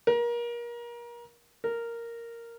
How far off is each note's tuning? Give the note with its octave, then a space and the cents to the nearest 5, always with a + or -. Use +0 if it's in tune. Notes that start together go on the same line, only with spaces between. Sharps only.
A#4 +30
A#4 -5